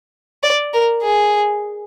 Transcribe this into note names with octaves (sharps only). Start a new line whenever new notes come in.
D5
A#4
G#4